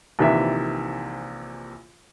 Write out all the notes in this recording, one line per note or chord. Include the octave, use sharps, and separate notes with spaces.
A#1 C3 D#3 E3 E5